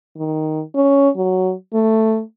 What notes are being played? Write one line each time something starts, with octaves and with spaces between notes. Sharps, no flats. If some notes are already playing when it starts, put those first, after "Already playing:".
D#3
C#4
F#3
A3